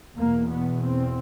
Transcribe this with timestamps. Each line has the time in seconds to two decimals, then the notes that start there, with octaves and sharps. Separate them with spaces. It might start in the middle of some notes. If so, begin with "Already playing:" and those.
0.17 E2 B2 A#3
0.51 B3
0.86 C4